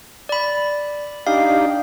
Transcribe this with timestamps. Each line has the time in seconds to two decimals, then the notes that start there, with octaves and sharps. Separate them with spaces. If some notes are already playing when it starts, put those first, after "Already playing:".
0.29 D5 B5
1.27 D4 D#4 G4 F5